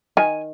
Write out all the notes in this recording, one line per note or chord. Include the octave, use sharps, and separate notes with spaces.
D#3 G#5